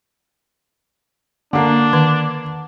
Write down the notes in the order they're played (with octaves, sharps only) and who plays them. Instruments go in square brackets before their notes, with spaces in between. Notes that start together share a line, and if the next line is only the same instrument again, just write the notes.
[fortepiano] D3 A#3 [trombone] D4
[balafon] D#3